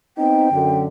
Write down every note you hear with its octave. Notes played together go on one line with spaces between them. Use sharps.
B3 C4 D#4 G5
F#2 D3